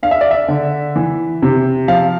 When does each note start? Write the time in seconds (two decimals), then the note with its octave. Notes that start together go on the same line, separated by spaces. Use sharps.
0.03 D4 F5
0.11 E5
0.21 D5
0.31 E5
0.48 D3
0.96 E3
1.43 C3
1.88 F3 F5